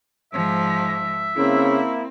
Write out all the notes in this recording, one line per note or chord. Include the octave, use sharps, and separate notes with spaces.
G#2 F3 E5
C#3 A#3 C4 E4